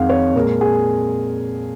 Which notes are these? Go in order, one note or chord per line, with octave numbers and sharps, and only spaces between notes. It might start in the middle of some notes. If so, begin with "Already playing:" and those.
Already playing: F2 D#3 G#3 F5 F#5
C#5
A#2 G#3 A#4
G#4